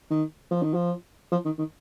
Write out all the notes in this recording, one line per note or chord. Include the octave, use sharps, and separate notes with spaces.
D#3
F3
D#3
F3
F3
D#3
D#3